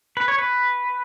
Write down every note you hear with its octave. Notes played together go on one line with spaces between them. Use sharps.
B4
C#5
B4